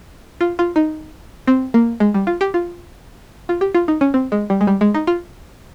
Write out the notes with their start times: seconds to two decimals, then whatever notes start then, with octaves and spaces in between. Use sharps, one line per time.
0.41 F4
0.59 F4
0.76 D#4
1.47 C4
1.74 A#3
2.00 G#3
2.14 G3
2.27 F4
2.41 G4
2.54 F4
3.49 F4
3.61 G4
3.75 F4
3.88 D#4
4.01 C#4
4.14 C4
4.32 G#3
4.50 G3
4.61 G#3
4.67 G3
4.81 G#3
4.94 D#4
5.07 F4